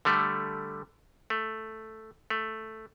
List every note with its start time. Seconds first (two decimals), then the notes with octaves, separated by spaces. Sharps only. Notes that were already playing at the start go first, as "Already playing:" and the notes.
0.05 D3 G3 A3
1.30 A3
2.30 A3